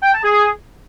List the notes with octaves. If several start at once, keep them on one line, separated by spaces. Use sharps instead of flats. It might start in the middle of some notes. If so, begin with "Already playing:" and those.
G5
A5
G#4